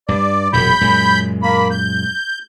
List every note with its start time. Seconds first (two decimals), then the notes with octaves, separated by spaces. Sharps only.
0.08 G2 D5
0.53 E1 F#2 A#2 B5 G6
0.81 F#2 A#2 G#3
1.43 A#3 B5
1.71 G6